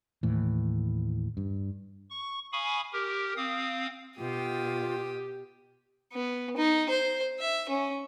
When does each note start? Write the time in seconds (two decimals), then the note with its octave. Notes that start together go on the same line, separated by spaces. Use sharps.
0.23 D#2 A2 E3
1.37 G2
2.10 C#6
2.52 F5 G#5 B5 C#6 D#6
2.93 G4 A#4
3.37 C4 F5 D#6
4.19 B2 F4 G4 G5 D#6
6.13 B3
6.57 D#4
6.90 C5
7.39 E5
7.69 C#4